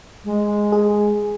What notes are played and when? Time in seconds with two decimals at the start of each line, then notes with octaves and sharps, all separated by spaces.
0.25 G#3
0.72 G#4